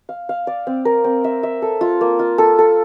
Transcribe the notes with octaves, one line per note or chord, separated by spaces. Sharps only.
F5
F5
D5
C4
A#4
C4
E5
E5
A4
F4
A#3
F4
A4
A4